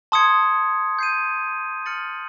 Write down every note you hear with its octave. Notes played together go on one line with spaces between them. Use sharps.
A5 C6 D#6 G#6 C#7
G6 C7 D#7
F6 A6 C#7 F#7